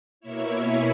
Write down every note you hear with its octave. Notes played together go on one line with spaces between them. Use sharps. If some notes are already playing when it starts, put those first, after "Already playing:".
B2 A#3 E4 C#5 E5
G#5 B5